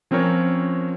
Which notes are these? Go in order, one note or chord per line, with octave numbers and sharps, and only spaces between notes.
F3 C4 C#4 A#4 C#5